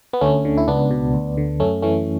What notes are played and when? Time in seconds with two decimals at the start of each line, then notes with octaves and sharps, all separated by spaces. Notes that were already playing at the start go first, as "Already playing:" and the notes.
0.13 B3
0.21 D2 A3 C#4
0.45 D3
0.58 E4
0.68 C#2 B3 D4
0.91 B2
1.14 D2
1.38 D3
1.60 F#2 A3 C#4
1.82 E3 A3 C#4